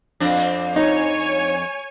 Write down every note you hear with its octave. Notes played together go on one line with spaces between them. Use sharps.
F2 C4 D4
D#4 C#5 G#5